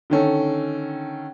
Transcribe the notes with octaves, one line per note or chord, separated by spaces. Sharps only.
D3 D#3 C#4 A4